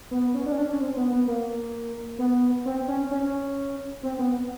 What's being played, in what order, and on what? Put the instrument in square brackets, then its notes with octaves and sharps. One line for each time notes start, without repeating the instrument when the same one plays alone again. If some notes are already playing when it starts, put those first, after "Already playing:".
[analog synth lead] B3
C#4
D4
C#4
D4
C#4
C4
B3
B3
A#3
B3
C4
C#4
C#4
C4
B3